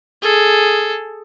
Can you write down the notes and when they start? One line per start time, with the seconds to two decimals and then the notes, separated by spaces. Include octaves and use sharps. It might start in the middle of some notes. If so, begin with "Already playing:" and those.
0.22 G#4 A4